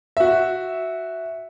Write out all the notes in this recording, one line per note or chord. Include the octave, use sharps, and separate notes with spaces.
F#4 E5